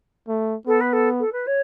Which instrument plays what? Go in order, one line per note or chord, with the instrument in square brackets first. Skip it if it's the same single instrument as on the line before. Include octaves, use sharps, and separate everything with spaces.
[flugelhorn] A3
[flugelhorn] B3 [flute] A4
[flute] B4
A4
A4
B4
C#5